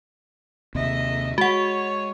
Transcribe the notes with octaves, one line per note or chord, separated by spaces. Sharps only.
D#2 C3 D#5 E5
G#3 F#4 C#5 F#5